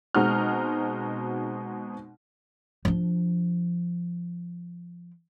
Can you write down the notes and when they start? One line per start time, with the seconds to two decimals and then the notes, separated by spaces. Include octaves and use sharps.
0.15 B2 G#3 C4 D#4 F#4 F6
2.85 F3 D4